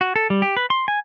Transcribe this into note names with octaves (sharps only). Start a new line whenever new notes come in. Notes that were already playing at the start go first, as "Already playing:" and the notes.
F#4
A4
G3
G4
B4
C6
G#5